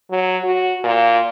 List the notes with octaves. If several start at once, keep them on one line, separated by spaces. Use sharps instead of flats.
F#3
F#4
A#2